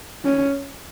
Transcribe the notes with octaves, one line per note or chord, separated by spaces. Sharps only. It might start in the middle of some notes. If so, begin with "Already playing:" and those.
C#4